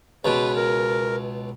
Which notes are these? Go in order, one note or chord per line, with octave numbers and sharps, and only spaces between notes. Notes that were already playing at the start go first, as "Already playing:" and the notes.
C#2 B2 B4
A#4